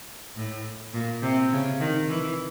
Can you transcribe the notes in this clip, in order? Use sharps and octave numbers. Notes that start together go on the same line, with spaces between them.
A2
A#2
C3
C#3
D#3
E3